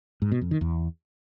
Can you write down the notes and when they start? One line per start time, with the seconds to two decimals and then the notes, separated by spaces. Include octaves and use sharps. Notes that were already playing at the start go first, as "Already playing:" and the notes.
0.22 G#2
0.32 B2
0.41 F2
0.51 D#3
0.61 E2